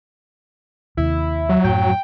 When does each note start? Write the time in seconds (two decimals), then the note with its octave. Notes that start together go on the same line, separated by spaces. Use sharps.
0.97 D#2 C3 E4
1.49 F#3
1.64 F#2 A2 G5